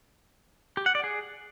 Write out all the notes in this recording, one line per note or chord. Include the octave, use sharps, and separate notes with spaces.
G4
F#5
D5
G#4